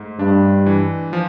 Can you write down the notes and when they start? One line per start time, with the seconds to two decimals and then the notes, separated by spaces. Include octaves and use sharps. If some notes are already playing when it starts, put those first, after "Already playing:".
Already playing: G#2 A3
0.19 G2 D4
0.66 E3
1.13 F3